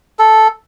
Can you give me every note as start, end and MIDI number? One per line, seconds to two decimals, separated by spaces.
0.19 0.48 69